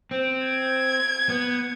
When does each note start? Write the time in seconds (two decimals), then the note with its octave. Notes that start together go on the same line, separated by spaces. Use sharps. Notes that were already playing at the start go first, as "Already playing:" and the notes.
0.11 C4
0.47 G#6
1.29 B3